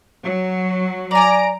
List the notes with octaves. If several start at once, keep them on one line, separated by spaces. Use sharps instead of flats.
F#3
D5 G#5 A#5 D7